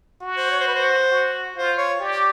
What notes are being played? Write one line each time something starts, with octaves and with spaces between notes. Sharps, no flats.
F#4
C5
C#5
C5
B4
C5
F#4
F4 C5
C#5
G4 D5